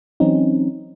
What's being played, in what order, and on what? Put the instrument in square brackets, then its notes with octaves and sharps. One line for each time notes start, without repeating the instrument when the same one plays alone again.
[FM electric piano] E3 F#3 C4 C#4 D#4